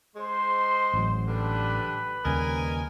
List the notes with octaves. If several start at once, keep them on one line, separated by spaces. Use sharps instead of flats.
G#3 C5 C6
A1 F#3
D3 G3 D4 B4
D#2 C#3 G3 A#4 D#5 G#5